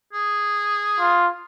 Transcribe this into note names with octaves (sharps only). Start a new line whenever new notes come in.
G#4
F4